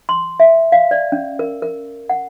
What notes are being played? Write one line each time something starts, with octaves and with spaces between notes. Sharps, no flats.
C6
E5
F5
D5
C#4
A#4
A#4
F#5